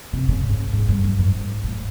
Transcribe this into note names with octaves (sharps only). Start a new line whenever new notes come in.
C3
C#3
G#2
G#2
G2
F#2
G#2
A2